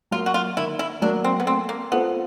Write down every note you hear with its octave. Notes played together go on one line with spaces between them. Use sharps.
F#3 A#3 F4
F#4
F4
D#3 E4
E4
F#3 A#3 D4
C4
B3
A3 C4
A#3
B3 C4 F4 A4 C5